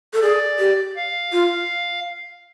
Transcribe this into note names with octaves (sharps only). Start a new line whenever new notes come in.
A4
G#4 D5
G4
F5
F4